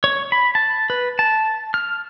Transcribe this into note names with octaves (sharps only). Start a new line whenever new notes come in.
C#5
B5
A5
B4
A5
F6